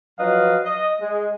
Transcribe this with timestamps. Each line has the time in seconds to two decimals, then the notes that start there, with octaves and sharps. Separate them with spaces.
0.19 F3 F#3 B4 D#5 F5
0.64 D#5
1.01 G#3